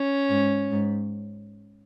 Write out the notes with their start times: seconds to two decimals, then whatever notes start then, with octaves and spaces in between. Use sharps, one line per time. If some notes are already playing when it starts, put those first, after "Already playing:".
Already playing: C#4
0.29 G#2
0.71 G#2